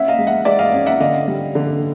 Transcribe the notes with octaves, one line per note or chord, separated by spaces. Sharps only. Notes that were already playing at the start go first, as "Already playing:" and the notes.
Already playing: C#4 E5 F#5
D#5 F5
G#3
E5 F#5
G#3 D5 E5
D#5 F5
C#4
E5 F#5
D3 D#5 F5
G3
D3